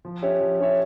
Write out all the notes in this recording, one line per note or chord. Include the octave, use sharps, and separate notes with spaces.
F3
C#4 G4 C#5 E5
F3
C#4 G4 C#5 E5